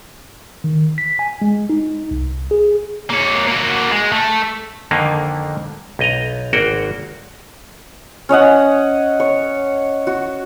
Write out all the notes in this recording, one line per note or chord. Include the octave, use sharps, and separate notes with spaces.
D#3
B6
G#5
G#3
D#4
C2
G#4
A#3 C#5
A#3 F#4
G#3
A3
F2 D3 D#3 A#3
B1 D#5 A#5
G#1 A#3 F#4 G5
C#4 C#5 D#5 F#5
C#5
F#4